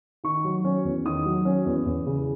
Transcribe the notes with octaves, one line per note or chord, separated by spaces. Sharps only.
D#3 C#6
F#3
C#4
E2
D#3 D#6
F#3
C#4
E2
E2
C#3